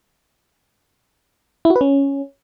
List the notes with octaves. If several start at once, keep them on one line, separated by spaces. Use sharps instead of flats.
E4
F#4
B4
C#4